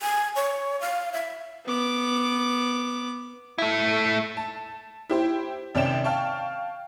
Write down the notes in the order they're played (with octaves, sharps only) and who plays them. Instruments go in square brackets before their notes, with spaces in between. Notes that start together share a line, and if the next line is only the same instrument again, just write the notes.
[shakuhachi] G#5
C#5
F5
E5
[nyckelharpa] B3 D6
[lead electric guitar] A3 E4
[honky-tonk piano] A5
E4 G4 C5
G#1 C3 C#4 D5 G5 E7
F5 G5 A5 C#6